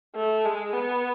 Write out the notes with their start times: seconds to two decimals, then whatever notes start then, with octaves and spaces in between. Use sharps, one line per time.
0.15 A3
0.45 G#3
0.73 B3